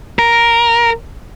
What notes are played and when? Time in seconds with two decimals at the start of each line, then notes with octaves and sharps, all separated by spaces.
0.19 A#4